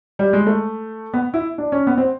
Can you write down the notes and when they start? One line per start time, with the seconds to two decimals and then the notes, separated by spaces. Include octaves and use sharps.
0.19 G3
0.33 G#3
0.47 A3
1.14 B3
1.34 E4
1.58 D4
1.72 C#4
1.87 B3
1.97 C4